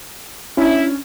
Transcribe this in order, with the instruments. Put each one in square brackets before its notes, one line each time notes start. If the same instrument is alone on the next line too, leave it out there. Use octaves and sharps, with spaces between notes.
[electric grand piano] C#4 D4 [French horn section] E4